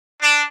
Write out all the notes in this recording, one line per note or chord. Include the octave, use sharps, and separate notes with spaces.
D4